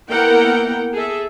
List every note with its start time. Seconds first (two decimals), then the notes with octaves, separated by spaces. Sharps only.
0.10 A#3 B3 E4 A#4 F#5 G5
0.93 G#4 A4 E5